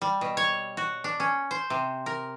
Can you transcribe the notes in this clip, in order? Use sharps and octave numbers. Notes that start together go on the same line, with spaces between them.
G3
B2
C#5
F#4
D4
C#4
C5
C3
A#4